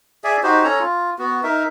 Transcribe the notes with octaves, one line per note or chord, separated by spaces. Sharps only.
G#4 D5 E5 G#5
D#4 F#4 G4 C5
C#4 A4 C#5 A#5
F4
B3 F#4
D#4 A#4 E5